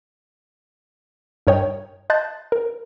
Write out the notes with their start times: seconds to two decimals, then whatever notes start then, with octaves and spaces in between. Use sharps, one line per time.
1.47 G2 A#4 C#5 D#5 G5
2.10 D#5 A5 C6 F#6 G6 A6
2.52 A#4